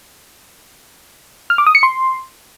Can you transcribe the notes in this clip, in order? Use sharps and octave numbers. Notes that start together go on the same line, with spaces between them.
F6
D6
D#6
C#7
C6